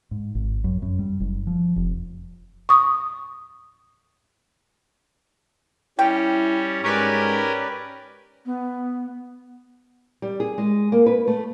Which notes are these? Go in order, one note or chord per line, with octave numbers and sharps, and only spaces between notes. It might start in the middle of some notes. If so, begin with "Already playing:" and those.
G#2
G#1
F#2
F#2
G3
F#1
F3
F1
C#6 D#6
G3 C#4 E4 G5
G#2 C#4 G4 A#4 B4 D5 G#5
B3
G3
G#4
G#3
A#3
B4
A3